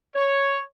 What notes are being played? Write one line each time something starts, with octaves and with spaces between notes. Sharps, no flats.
C#5